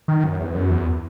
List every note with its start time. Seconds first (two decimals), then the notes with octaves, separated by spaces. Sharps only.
0.08 D#3
0.24 F#2
0.39 E2
0.55 F#2
0.71 E2